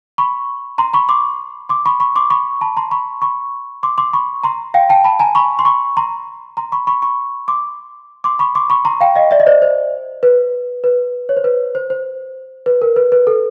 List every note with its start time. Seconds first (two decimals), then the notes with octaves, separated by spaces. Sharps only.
0.18 B5 C#6
0.78 A#5 C6
0.94 B5 C#6
1.09 C6 D6
1.69 C6 D6
1.86 B5 C#6
2.00 B5 C#6
2.16 C6 D6
2.30 B5 C#6
2.61 A5 B5
2.77 A#5 C6
2.91 B5 C#6
3.22 B5 C#6
3.83 C6 D6
3.98 C6 D6
4.13 B5 C#6
4.43 A#5 C6
4.74 F5 G5
4.89 G5 A5
5.04 A5 B5
5.20 G#5 A#5
5.35 B5 C#6
5.59 C6
5.65 B5 C#6
5.97 A#5 C6
6.57 A#5 C6
6.72 B5 C#6
6.87 B5 C#6
7.02 B5 C#6
7.48 C6 D6
8.24 C6 D6
8.39 B5 C#6
8.55 C6 D6
8.70 B5 C#6
8.85 A#5 C6
9.01 F5 G5
9.15 D#5 F5
9.31 D5 E5
9.40 D#5
9.47 C5 D5
9.62 C5
10.23 B4
10.84 B4
11.29 C#5
11.37 C5
11.44 B4
11.75 C5
11.90 C5
12.66 B4
12.82 A#4
12.96 B4
13.12 B4
13.27 A4